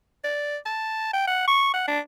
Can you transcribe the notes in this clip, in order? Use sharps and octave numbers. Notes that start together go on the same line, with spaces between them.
D5
A5
G5
F#5
C#6
F#5
D4